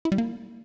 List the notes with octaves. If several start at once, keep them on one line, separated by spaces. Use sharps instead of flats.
E4
G3
A#3